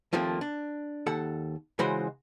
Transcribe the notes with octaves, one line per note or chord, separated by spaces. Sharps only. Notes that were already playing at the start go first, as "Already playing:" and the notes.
D#2 F3 A3 A#3 C4
D4
D#2 A4 F#5
C#2 E3 G#3 F#4 C5 B5